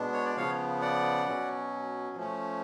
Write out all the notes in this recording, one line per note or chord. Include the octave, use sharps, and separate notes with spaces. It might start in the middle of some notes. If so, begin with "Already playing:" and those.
Already playing: B2 G#3 B3 D4
C#5
D5
C#3 F3 B3 C#5 F5
D5 F#5
B2 F#3 C#4
F3 A3 C#4